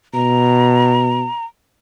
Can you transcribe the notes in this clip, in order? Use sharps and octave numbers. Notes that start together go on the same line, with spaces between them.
B2 A#5